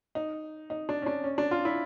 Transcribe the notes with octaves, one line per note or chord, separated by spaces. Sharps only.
D#4
D#4
D4
C#4
D4
C#4
D4
F4
E4